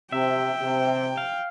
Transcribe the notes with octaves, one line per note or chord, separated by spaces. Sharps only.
C3 E5 G5
C3
F5